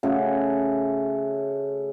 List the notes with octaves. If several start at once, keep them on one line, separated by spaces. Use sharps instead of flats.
C#3 A3 F#4